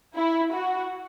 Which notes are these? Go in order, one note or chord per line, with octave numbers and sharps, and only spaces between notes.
E4
F#4